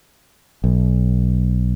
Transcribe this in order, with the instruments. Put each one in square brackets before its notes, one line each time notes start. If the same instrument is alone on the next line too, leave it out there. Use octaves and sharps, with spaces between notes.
[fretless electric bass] B1